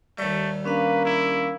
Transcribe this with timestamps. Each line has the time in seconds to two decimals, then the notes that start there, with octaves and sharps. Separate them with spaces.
0.18 D#2 G3 A3
0.65 A#3 C#4 D4 B4 F5
1.06 E4